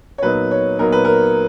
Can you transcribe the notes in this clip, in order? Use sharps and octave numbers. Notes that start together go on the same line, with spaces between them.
C#5
A#2 F#3 B3 D#4 B4
C#5
A#2 F#3 B3 D#4 A#4
B4
A#4